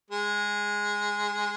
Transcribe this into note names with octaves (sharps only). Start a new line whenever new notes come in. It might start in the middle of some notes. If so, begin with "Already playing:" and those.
G#3